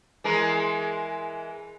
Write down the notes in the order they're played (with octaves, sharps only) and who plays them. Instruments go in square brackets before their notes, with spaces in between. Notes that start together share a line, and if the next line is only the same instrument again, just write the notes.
[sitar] E3 G#3 A#4